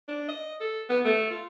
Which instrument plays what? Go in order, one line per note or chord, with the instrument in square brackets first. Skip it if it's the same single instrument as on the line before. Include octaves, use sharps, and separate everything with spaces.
[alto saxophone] D4
D#5
A4
B3
A3
F4